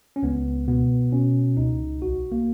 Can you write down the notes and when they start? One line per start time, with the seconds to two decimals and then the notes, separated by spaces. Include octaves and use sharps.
0.16 C#4
0.23 C#2 B3
0.67 B2 B3
1.12 B2 C#4
1.57 C#2 D#4
2.02 B1 F#4
2.32 A#3